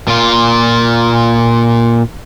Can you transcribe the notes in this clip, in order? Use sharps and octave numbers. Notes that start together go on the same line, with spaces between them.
A#2 F4